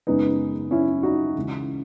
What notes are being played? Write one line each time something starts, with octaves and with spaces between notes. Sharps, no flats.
F#1 F#2 C#3 G#3 B3 D#4
C#4 E4
D#4 F#4
C#2 C#3 E3